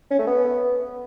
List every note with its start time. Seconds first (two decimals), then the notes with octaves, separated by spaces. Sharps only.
0.11 C#4
0.19 A3
0.27 B3